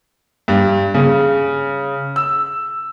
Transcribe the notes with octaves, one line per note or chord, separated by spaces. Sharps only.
G2
C#3
E6